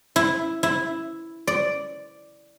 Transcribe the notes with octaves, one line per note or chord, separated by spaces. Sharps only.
E4
E4
D5